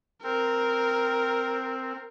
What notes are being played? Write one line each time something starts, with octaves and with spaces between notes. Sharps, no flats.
C4 A#4